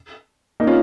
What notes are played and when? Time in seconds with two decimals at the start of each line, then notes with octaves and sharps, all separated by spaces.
0.60 A#3 D#4
0.67 C#4 F4